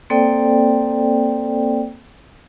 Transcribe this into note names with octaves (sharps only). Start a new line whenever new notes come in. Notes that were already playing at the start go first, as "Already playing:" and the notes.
A#3 C4 A4 C5 D5 G5